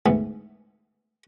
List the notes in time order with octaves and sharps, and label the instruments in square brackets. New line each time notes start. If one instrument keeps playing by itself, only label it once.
[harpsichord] D2 G#2 E3 B3